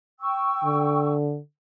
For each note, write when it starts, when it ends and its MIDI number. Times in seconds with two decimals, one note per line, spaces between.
0.20 1.12 79
0.20 1.12 85
0.20 1.12 88
0.64 1.39 50